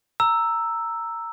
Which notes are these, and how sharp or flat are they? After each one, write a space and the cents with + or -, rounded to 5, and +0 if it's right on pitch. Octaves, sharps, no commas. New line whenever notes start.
A#5 -10 E6 +0